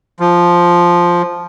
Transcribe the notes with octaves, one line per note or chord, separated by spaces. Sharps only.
F3